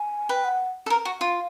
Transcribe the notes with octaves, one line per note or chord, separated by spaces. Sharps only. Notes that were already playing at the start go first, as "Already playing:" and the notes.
Already playing: G#5
B4 G5
F#5
A4
A#4
F#4
F4 F5